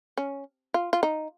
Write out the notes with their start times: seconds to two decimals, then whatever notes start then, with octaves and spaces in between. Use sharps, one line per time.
0.17 C#4
0.74 F4
0.93 F4
1.03 D#4